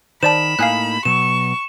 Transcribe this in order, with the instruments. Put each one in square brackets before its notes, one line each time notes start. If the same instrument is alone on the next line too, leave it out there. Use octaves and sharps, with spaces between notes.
[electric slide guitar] D#3 [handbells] C5 D5 A5 [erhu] B5 [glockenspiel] E7
[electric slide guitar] A2 A#3 D#4 [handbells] F5 G#5 F#6
[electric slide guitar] B2 F#3 [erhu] C#6 [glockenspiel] E7